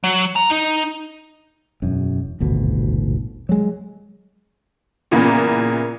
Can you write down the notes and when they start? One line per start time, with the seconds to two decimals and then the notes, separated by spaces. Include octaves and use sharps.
0.04 F#3
0.36 A#5
0.50 D#4
1.82 E1 F#2
2.40 D#1 G#1 D2 B2
3.49 F#3 G#3
5.11 A#2 C#3 E3 A#3 B3